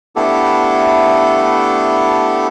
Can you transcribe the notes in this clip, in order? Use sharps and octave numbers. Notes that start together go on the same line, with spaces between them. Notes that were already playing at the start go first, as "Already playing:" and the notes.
A3 B3 D4 E4 G4 A4